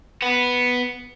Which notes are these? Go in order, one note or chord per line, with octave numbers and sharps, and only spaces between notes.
B3